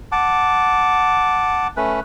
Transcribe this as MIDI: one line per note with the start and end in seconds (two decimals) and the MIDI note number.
0.12 1.67 78
0.12 1.67 81
0.12 1.67 86
1.77 2.00 57
1.77 2.00 61
1.77 2.00 71